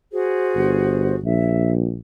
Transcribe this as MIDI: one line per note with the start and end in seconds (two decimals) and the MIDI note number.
0.12 1.16 66
0.12 1.16 68
0.12 1.16 72
0.56 1.18 31
1.24 1.99 34
1.24 1.72 76